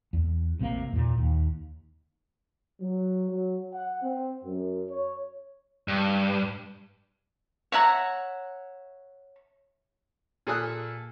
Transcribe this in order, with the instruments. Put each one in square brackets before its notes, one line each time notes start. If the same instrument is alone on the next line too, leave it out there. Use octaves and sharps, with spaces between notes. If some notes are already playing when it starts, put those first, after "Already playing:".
[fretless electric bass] E2
A1 C3 G#3 A#3
E2 A#2
D#2
[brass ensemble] F#3
F#3
F#5
C4
F#2
C#5
[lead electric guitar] G2
[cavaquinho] C#5 E5 F#5 A#5
[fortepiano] A#2 G#4 A4 D#6 F6 F#6